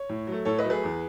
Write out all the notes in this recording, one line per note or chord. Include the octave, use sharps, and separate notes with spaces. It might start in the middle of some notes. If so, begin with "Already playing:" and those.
Already playing: C#5
A2
F#3 A3
A2 A4 C#5
B4 D#5
F#3 A3
G#4 B4
E2